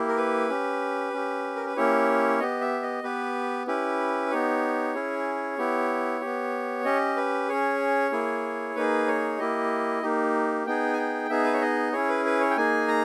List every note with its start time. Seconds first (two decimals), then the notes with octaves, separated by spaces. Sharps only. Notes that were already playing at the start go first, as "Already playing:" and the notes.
Already playing: A#3 E4 G4
0.08 A#4
0.17 B4
0.50 C#4 G4
1.13 C#4 G4
1.56 A#4
1.66 B4
1.76 A#3 C#4 E4 G4 C#5
2.40 B3 G4 D#5
2.61 E5
2.82 D#5
3.03 B3 G4 B4
3.67 C#4 E4 G4 B4
4.31 B3 D#4 G4 C#5
4.94 C#4 E4 G#4
5.58 B3 E4 G4
6.21 B3 G4
6.85 C#4 G4 D#5
7.16 B4
7.49 C#4 G#4 C#5
8.12 A#3 E4 G#4
8.76 A#3 D#4 G#4 B4
9.07 C#5
9.39 A#3 E4 G4 D#5
10.02 A#3 D#4 G4
10.66 B3 D#4 G#4 G5
10.93 G#5
10.98 G5
11.29 B3 D#4 G#4 E5
11.45 B4
11.53 C#5
11.61 D#5
11.93 C#4 E4 G#4 C#5
12.09 B4
12.25 B4
12.40 C#5
12.50 G5
12.57 A#3 D#4 G#4 G#5
12.88 A#5